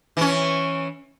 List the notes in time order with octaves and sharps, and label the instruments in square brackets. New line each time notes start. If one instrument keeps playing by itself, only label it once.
[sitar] E3 C#4